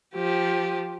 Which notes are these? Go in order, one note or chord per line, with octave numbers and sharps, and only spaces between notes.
F3 G4